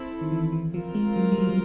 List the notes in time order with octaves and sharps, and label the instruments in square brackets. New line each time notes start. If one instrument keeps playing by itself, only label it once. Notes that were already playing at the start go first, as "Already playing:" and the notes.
Already playing: [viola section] C4 E4 A4
[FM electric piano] D#3
E3
E3
[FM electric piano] F3 [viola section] C4 F4 A#4
[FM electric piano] G#3
F#3
G3
F#3
F#3